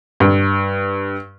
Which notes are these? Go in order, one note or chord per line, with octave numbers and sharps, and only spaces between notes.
G2